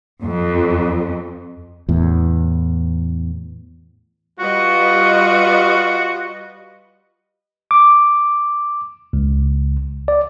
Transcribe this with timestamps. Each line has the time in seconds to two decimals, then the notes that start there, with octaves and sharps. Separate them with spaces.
0.21 F2
1.89 E2 A2
4.39 G3 F4 F#4 B4 D#5
7.71 D6
9.13 C#2
10.08 D5